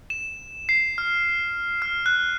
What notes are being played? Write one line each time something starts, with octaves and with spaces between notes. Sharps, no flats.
E7
C7
F6
F6
F#6